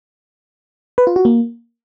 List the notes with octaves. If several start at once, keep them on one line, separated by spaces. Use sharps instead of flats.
B4
F4
F#4
A#3